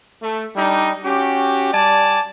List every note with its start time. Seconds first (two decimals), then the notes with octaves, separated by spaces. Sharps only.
0.22 A3
0.56 G3 D4 D#4
1.04 C#4 F#4 G4
1.73 G3 D5 G#5 A5